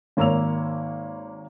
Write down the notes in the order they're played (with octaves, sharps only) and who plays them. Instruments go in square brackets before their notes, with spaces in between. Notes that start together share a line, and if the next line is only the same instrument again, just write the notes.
[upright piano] G#1 A#3 C#5 E6 F7